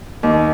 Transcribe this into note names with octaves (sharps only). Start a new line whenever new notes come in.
D#2